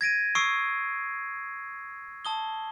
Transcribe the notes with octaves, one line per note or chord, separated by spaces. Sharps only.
G#6 A#6 D7 D#7
C#6 D#6 E6 C7 D7
A5 D#6 G7